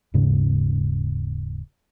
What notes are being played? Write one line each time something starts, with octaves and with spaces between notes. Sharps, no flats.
D#1 G#2 C#3